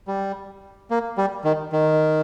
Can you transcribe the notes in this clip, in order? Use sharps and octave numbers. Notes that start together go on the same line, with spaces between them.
G3
A#3
G3
D#3
D#3